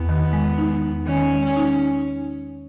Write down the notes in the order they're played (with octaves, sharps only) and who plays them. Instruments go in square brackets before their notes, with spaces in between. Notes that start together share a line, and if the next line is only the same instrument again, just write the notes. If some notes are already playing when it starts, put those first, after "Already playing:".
Already playing: [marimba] E2 [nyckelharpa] B3
[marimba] D#3
G#3
D#4
E2
[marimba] D#3 [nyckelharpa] C#4
[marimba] G#3
[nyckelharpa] C#4
[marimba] D#4